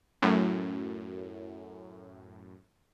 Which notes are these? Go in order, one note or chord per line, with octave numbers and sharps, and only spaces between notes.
F#2 A2